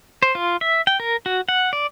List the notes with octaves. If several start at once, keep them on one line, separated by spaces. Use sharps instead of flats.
C5
F4
E5
G5
A#4
F#4
F#5
D5